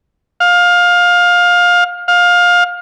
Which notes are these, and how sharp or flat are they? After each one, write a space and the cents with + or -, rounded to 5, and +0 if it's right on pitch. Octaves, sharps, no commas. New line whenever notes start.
F5 +20
F5 +20